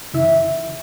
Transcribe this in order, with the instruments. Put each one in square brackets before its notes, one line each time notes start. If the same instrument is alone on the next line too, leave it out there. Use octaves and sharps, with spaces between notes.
[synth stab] F#2 C#3 E3 E5